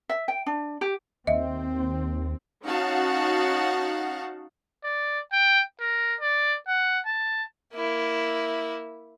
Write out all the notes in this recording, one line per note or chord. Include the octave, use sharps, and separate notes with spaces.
E5
G5
D4
G4
D#2 C4 D#5 E5
C#4 D#4 F#4 F5 F#5 A5
D5
G5
A#4
D5
F#5
A5
A#3 E4